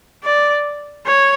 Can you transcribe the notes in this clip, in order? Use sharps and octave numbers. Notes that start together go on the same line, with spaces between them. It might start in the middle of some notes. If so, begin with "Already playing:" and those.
D5
C#5